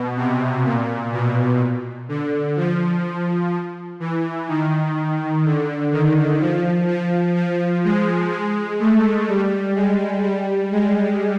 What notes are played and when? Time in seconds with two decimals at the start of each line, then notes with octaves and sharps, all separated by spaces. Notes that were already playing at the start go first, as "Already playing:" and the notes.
Already playing: B2
0.17 C3
0.65 A#2
1.12 B2
2.09 D3
2.56 F3
4.00 E3
4.48 D#3
5.45 D3
5.92 D#3
6.40 F3
6.88 F3
7.36 F3
7.84 G#3
8.32 G#3
8.80 A3
9.28 G3
9.75 G#3
10.24 G3
10.72 G#3